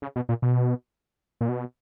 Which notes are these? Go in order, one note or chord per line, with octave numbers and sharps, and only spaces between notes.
C#3
B2
A#2
B2
A#2
B2